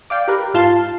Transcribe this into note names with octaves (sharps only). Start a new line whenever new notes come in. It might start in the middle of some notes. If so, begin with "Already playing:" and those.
D5 F5 G5
G4 A#4 B4
G#2 F4 F5 A5 C6